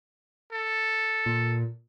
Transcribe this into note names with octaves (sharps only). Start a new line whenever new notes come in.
A4
A#2